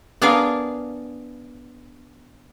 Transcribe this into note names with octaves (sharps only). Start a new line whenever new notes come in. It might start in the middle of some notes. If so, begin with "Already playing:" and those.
B3 D4 G#4 A#4 F5